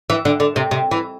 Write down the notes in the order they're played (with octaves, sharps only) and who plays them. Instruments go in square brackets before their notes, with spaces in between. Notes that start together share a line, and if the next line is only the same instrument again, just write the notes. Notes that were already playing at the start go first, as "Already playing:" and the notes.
[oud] E3
D3
D3
C3
C3
E3